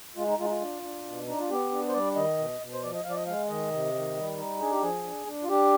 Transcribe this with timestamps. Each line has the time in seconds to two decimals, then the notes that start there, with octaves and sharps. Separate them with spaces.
0.16 G#3 F4
0.28 D#4
0.38 G#3 F4
0.44 D#4
0.50 F4
0.61 D4
0.83 D4
1.05 B2
1.27 D4 D#4
1.39 F4
1.49 B3 G4
1.71 D4
1.89 C5
1.93 G3 D5
2.16 D#3 D#5
2.38 B2
2.60 B2
2.73 C5
2.82 F3 D5
2.94 D#5
3.05 F3 F5
3.10 D5
3.15 D#5
3.27 G#3 F5
3.49 D#3 D#5
3.71 C3
3.94 D#3
4.16 G3
4.38 D#4
4.60 D4 G#4
4.71 G4
4.82 F3 G#4
5.04 D4
5.27 D4
5.43 F4
5.49 D4 G4